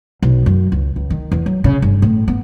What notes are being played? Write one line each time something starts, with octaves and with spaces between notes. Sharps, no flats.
B1
F#2
C#2
C#2
D#3
E2
F#3
C#3
G1
A2
B3